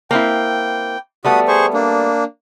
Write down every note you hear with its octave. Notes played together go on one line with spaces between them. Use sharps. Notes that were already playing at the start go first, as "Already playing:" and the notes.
A#3 C4 E4 G5
G3 A3 B3 F#4 D#6
G#4 C5 C#6
A#3 D4